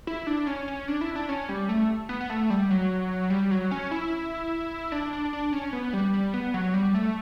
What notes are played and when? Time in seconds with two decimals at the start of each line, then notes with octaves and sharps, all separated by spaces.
0.07 E4
0.27 D4
0.47 C#4
0.68 C#4
0.88 D4
1.01 E4
1.16 D4
1.29 C#4
1.49 G3
1.69 A3
2.09 B3
2.21 B3
2.30 A3
2.50 G3
2.70 F#3
3.30 G3
3.51 F#3
3.71 C#4
3.91 E4
4.92 D4
5.13 D4
5.33 D4
5.53 C#4
5.73 B3
5.93 G3
6.14 G3
6.34 B3
6.54 F#3
6.74 G3
6.94 A3